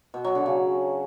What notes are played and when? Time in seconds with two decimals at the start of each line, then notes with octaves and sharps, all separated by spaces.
0.14 B2
0.24 F#3
0.35 D3
0.46 C#3